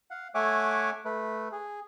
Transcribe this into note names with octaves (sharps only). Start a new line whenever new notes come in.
F5 F#5
A3 C#5 E5 F#5 G#5 D6
A3 B4
G#4